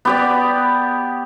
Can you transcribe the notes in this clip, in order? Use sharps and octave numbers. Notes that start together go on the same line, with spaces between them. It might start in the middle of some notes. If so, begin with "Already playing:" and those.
B3 G4 D5